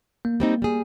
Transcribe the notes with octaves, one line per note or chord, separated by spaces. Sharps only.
A#3
G3 C4 D#4
G3 G#4